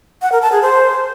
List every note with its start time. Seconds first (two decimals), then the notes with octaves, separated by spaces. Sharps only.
0.22 F#5
0.32 A#4
0.42 A5
0.52 G#4
0.62 C5